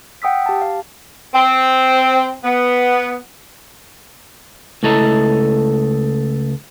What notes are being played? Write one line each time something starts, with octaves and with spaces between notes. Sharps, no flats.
F#5 G5 D#6 E6 B6
G4 A5
F5
C4
B3
C#2 A3 E4 A4 D#5 A#5